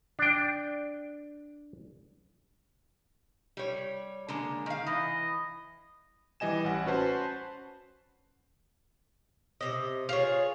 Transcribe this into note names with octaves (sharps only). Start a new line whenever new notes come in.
D4 G5
G3 C#5
D3 G#3 A#3
D#3 F5
E3 D#5
E3 G3 D#5 G#5 E7
A1 F#5
C#4 F#4 B4 C5 A5
C3 D#5
F4 G#4 C#5